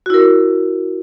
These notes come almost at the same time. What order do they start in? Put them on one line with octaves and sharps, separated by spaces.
F#4 E4 A#4